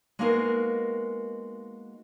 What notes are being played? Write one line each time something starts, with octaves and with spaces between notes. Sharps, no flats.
G#3 A#3 B3 D#4 F#4 A#4